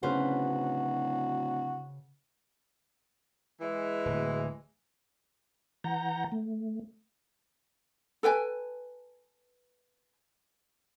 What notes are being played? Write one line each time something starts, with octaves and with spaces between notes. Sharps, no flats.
D1 C#3 F#4 B4 C5
E3 G#3
D1
E3 F#5 A#5 G6 A#6
A3
A4 B4 G5 G#5